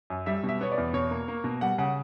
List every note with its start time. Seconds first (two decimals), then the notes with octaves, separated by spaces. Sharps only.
0.10 F#2
0.26 G3 E5
0.43 B2
0.49 E5
0.61 B3 C#5
0.71 D5
0.78 E2
0.93 B2 C#5
1.11 A#3
1.28 A#3
1.44 B2
1.61 G3 F#5
1.78 C#3 F#5